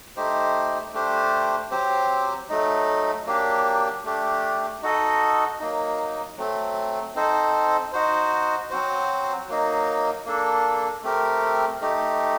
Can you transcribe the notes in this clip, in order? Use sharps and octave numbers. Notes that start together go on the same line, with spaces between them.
A3 D#4 G4 C5
A3 D4 G4 C5
F#3 C4 G4 C5
F#3 A3 D#4
F#3 A#3 D4 G4
A3 D4 G4
D#4 F#4 A4 D#5
F#3 A#3 D#4
F#3 A3 C4
C4 D#4 A4 C5
D#4 F#4 C5
F#3 C4 F#4 C5
F#3 A#3 D#4
A#3 D4 A4
A3 C4 G4 A#4
A3 D#4 G4